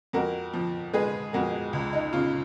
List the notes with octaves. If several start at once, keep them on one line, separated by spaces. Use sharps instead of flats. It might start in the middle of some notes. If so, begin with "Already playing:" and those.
F2 F#4 A#4
F3
G#3 G#4 B4
F2 F#4 A#4
C#2
D#4
C#3 F4